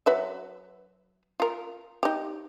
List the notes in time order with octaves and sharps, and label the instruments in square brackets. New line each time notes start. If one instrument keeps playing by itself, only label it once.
[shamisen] F#3 B4 E5
F4 A#4
D#4 G4